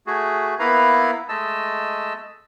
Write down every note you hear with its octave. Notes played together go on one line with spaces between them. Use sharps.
A3 F#4 G#4
A#3 B3 E4 B4 F5 A#5
G#3 A3 D#5 A5 E6